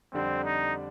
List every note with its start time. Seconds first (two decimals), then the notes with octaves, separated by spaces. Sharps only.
0.12 F2 D3 G3 C4 D4
0.45 D#4